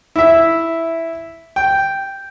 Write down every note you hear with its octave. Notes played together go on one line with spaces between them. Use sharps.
E4 E5
G5